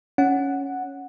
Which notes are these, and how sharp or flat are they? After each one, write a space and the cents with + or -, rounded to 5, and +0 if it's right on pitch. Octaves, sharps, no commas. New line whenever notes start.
C#4 +0 F#5 +0